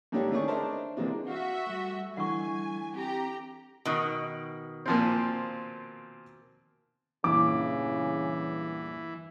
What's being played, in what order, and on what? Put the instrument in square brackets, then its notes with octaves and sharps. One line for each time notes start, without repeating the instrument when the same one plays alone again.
[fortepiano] G#2 D3 A#3 D4 G4 C#5
D#3 A3 C#4 G#4 D5 C#6
D4 D#4 A#4 C5 E5 A5
C3 E3 G#3 A#3 D4
[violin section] F#4 E5 [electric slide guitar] C5 F5
[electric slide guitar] G3 A3
[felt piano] D3 E3 [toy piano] F#5 C#6 [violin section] G#5
[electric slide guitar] C4 [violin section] G4 A#5
[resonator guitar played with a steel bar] B2 D#3
[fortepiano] A#2 F3 C4
[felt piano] E2 G2 A#2 [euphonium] C#3 [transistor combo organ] E3 [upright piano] D6